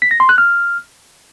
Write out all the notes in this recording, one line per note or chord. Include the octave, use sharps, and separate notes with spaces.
B6
A#6
C6
F#6
F6